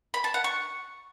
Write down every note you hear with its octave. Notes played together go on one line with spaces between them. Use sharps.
B5
A5
F#5
C#6